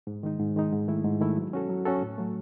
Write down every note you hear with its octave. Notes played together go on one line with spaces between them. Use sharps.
G#2
D#3 G#3 D#4
G#2
D#3 G#3 D#4
G#2
D#3 A3 E4
G#2
D#3 A3 E4
F#3
C#4 F#4 A4
F#3
C#4 F#4 A4
A2
F#3 A3